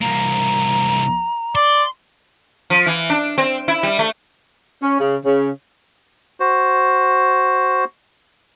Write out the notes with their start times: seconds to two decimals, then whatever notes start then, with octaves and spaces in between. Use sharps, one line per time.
0.02 C2 A#3 A#5
1.55 D5 C6
2.70 F3
2.86 E3
3.10 D4
3.38 C4
3.68 E4
3.83 G3
3.99 A3
4.83 C#4
5.00 C#3
5.25 C#3
6.40 F#4 C5